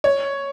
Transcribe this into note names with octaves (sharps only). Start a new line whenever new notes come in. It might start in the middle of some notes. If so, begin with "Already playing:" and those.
C#5